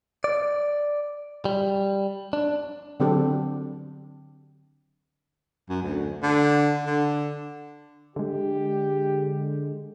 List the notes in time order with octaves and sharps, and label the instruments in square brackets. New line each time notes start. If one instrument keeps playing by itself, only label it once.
[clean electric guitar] D5
G3
D4
[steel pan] D3 F#3 C4 D4 G4 A4
[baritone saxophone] F#2
D2
D3
D3
[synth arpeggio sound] D3 G#3 [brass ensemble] G4